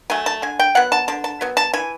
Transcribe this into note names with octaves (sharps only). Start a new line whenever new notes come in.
F#3 A3 G#5
A5
D3 G#5
G5
F#3 B3 F#5
A5
D3 A5
A5
F#3 B3
A5
E3 G#5